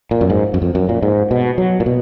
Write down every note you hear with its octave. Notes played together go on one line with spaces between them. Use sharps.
A#2
F#2
G#2
F#2
F2
F#2
A#2
G#2
B2
F#3
A#2
B2